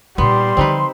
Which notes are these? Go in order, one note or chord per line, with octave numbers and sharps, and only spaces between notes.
A#2 G3 B3 D#4 C6
D3 F3 C4 D#4 B4